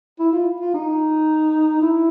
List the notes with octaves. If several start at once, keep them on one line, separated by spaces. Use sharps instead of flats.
E4
F4
F4
D#4
E4